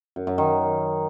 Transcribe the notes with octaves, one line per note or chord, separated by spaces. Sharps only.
F#2
F#2
D#3